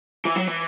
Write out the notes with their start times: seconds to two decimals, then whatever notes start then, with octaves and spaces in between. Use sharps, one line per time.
0.25 E3
0.36 F#3
0.47 E3